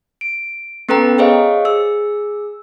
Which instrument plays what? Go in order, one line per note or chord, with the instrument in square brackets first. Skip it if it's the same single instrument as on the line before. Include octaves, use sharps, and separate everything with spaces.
[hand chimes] D7
B3 C#4 A4 B4 G5 A#5
G#4 C5 C#5 D#5 F5
G#4 E6